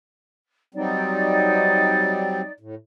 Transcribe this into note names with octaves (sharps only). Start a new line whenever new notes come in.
F#3 G3 C4 D#4 D5
A2